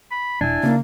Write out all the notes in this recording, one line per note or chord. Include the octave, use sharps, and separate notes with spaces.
B5
E1 D4 E4 G#5
C#3 A#3